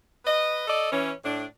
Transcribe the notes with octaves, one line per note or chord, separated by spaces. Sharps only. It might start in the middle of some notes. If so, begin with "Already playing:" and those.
B4 D#5
A4 D5 D#5
E3 C#4
A2 D4